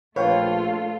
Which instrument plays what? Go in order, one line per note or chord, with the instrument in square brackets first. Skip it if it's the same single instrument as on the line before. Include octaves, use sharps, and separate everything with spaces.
[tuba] A#1 [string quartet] A3 F4 A4 [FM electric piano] B4 F5 G5 [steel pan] C#5